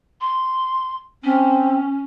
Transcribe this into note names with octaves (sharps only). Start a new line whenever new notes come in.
C6
C4 C#4